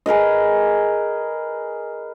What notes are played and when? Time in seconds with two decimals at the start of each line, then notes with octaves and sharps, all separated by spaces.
0.06 G#4 A#4 B4 D#5